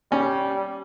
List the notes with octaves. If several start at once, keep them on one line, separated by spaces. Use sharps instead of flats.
G3 C#4